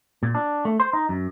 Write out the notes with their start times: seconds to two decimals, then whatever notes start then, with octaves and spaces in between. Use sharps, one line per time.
0.23 A#2
0.35 D4
0.65 A3
0.80 C5
0.93 D#4
1.09 F#2